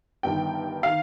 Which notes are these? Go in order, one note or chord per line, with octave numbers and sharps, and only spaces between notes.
G1 G2 D#3 G5
D#3 F5